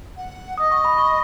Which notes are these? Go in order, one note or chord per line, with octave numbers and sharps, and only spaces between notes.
F#5
D#5 D#6
C#6
B5
C#6